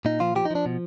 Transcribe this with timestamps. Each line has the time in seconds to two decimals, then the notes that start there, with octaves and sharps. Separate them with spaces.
0.05 A#2 D#4
0.20 F3 F4
0.35 F3 G4
0.45 D#4
0.51 F3 D4
0.66 B2